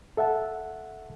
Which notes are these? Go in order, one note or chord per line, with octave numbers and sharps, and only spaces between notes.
A4 E5 F#5 A5